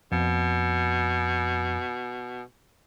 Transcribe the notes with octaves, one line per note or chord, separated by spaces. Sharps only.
F2 B2